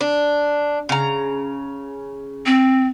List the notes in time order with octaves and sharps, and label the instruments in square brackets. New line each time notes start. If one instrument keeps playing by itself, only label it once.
[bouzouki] D4
C#3 A#5
[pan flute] C4